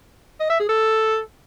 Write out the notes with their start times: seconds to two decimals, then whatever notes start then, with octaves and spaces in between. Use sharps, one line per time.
0.40 D#5
0.50 E5
0.59 G#4
0.69 A4